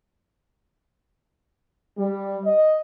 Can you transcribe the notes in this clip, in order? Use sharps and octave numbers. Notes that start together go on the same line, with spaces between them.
G3
D#5